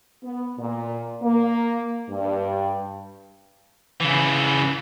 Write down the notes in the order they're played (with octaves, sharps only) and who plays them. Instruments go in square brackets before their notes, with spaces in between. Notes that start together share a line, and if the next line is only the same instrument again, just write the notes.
[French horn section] B3
A#2
A#3
G2
[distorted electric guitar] C#3 E3